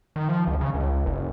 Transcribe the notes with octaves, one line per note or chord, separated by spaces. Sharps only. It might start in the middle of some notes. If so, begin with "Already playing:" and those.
D#3
F3
C#2
C#3
C#2
F#1